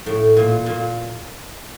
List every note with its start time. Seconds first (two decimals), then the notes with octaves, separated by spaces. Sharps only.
0.06 A2
0.37 A#2
0.66 A#2